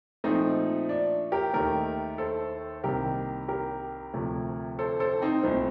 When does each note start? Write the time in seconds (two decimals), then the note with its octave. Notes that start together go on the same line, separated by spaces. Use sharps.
0.24 A#2 F3 A3 C4 D#4
0.89 D4
1.32 G4 A#4
1.54 D#2 D#3 A3 G4 A#4
2.18 A4 C5
2.84 C2 C3 D#3 A#3 G4 A#4
3.48 G4 A#4
4.14 D2 C3 F3 A3
4.79 A4 C5
5.00 A4 C5
5.22 C4 D#4
5.43 C2 A#2 A3 C4